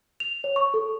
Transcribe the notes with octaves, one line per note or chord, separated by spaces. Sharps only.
F7
C#5
C#6
A4